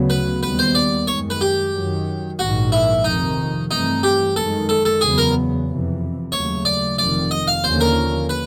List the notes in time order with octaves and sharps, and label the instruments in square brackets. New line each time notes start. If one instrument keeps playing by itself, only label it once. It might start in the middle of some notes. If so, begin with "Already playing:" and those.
Already playing: [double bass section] D2 C#3 F#3 B3
[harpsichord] B4
[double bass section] D#2 D#3 G3 B3 [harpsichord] B4
[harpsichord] C5
D5
[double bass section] F#2 D#3 G#3 [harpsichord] C#5
[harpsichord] B4
G4
[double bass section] F#2 D#3 F#3
[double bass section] A#1 G#2 D#3 [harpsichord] F#4
[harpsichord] E4
[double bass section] F1 F2 C3 D#3 [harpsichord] D#4
[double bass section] G2 E3 A3 C4 [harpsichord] D#4
[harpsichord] G4
[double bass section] F#2 D#3 G#3 [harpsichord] A4
[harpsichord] A4
A4
[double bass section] E2 C#3 F#3 B3 [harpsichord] G#4
[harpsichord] A#4
[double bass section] F2 C3 E3
[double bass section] D#2 C#3 F#3 A3 [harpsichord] C#5
[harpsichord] D5
[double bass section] F1 F2 C3 D#3 [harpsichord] D5
[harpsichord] D#5
F5
[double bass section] D#2 D3 F3 A#3 C#4 [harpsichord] C5
[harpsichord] A#4
B4